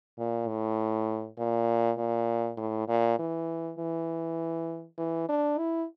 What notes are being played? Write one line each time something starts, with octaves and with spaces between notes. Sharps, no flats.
A#2
A2
A#2
A#2
A2
A#2
E3
E3
E3
D4
E4